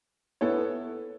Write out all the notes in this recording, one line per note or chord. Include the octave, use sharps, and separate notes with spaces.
B3 E4 A4 C#5